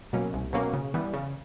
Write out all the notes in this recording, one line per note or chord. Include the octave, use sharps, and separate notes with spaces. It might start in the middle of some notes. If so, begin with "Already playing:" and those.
B2 F#3 A#3 C#4
C2
B2 F#3 A#3 C#4
C#3
E3 G3 B3
C#3